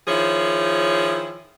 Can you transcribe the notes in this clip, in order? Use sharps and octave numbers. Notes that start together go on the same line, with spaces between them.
D#3 F3 E4 G#4 C#5